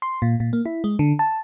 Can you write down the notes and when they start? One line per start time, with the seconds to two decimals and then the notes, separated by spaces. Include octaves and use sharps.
0.02 C6
0.22 A#2
0.40 A#2
0.53 A#3
0.66 E4
0.84 G#3
0.99 D3
1.19 A5